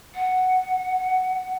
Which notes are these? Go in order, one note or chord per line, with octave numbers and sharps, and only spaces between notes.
F#5